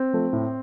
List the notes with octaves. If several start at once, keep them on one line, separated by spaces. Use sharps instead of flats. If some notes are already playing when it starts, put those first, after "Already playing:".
Already playing: C4
F3 A3
A2